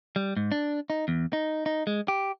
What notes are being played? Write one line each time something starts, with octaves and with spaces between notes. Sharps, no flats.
G3
G#2
D4
D#4
E2
D#4
D#4
G#3
G4